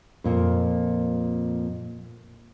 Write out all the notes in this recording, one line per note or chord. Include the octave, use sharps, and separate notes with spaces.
F2 A#2